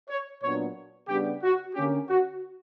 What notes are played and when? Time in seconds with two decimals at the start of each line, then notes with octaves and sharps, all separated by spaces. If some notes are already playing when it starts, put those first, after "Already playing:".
0.10 C#5
0.43 A#2 F#3 B3 D4 C#5
1.09 C#3 G3 B3 D4 G4
1.43 F#4
1.75 D3 A#3 C#4 G4
2.09 F#4